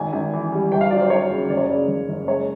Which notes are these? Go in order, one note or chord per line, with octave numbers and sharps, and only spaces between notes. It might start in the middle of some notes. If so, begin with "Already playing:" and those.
Already playing: G#1 G#5
G#1
E3
G3
G1 G5
F5
F#3 D5
C5
F#3 C#5
C#3
F#1 D5
C#5
D5
C#3
F#1
F#1
G#3 C#5